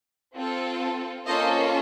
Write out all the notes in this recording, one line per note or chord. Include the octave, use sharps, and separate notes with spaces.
C4 F4 A4
A#3 C#4 F4 A4 C5 D#5